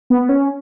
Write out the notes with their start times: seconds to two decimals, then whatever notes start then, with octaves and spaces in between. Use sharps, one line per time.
0.10 B3
0.29 C#4